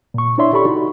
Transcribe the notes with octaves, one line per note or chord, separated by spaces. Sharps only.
A#2 C#6
D4 E4 C#5 D5 E5 C6
G4 A4 D5 B5 C#6
D#4 F#4